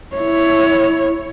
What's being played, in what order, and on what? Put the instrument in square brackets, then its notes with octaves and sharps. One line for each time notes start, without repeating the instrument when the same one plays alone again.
[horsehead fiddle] E4 C#5